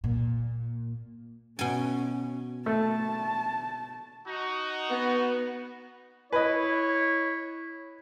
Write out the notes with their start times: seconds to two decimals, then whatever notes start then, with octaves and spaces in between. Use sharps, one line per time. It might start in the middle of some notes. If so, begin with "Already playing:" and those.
0.04 A#2
1.59 B2 C#4 G#5
2.66 A3 A5
4.27 D#4 F#4
4.88 B3
6.33 E4 B4 C#5 D#5